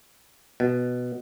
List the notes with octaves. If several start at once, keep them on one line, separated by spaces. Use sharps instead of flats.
B2